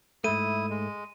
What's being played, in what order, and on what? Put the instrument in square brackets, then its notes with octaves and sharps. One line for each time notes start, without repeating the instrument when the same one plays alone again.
[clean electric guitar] G#2 A3 [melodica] E4 D#6 [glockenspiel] D#7
[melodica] G#3